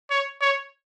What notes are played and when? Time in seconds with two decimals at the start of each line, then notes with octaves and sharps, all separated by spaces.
0.10 C#5
0.41 C#5